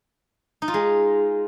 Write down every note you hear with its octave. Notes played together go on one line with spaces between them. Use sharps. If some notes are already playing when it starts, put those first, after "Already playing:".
D#4
F4
G#3